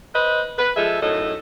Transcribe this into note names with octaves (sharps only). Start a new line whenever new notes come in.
B4 C5 D#5
B4
F3 G#3 G#4 A4 D#5 E5
F#2 A2 D#4 A4 D#5